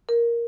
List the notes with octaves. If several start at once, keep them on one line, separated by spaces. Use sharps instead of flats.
A#4